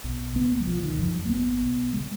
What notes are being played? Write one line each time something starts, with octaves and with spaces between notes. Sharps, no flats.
B1 B2
C#2 C#3 B3
A#3
F#3
C#2 B2 F3
D#3
F#1 F2 C#3 F3
F#3
A#3
G#1 G#2 B3
B1 B2
C#3 G#3